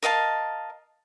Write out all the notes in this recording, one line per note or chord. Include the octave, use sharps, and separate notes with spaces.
A#4 D#5 F5 A5